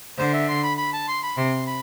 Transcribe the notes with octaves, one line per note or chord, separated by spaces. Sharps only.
D3 C5
E5
C6
B5
B5
A5
C6
B5
C3 C6
B5